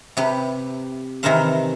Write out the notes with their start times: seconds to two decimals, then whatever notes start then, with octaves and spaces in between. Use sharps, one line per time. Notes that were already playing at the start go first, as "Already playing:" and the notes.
0.17 C3 G4 B4
1.23 C3 D#3 E3 A#4 C5 F5